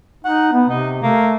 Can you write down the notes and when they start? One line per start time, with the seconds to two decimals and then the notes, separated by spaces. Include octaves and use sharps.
0.25 D#4 F#5
0.53 B3
0.70 C3 D#4
1.03 A3 A#3